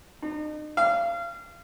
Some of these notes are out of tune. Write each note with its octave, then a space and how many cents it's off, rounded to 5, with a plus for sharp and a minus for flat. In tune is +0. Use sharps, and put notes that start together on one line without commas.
D#4 -40
F5 -30